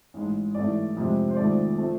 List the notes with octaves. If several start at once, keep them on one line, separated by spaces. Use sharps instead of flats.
A1 G#2 G#3
A1 G#2 E3 A3 D5
F2 C3 G#3
C5
G#1 G#2 F3 A3 D5
F3 A3